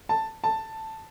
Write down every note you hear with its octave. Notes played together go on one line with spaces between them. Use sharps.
A5
A5